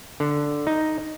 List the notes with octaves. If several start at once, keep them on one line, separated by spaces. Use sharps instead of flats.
D3
D#4